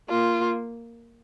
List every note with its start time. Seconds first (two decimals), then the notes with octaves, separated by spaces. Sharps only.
0.09 A#3 F4